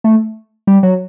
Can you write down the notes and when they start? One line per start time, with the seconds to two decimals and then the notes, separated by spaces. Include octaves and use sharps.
0.04 A3
0.67 G3
0.83 F#3